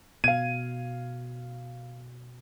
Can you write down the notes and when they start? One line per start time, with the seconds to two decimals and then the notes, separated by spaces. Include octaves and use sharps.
0.24 B2 F5 G#6 D#7